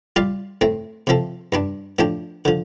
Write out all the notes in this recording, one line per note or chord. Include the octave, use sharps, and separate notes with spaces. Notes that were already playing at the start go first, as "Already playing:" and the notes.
G3 F4 D5 F5
A2 A3 C4
C3 F3 C4 A4
G2 G3 D4
A2 F3 D4 G4
D3 F3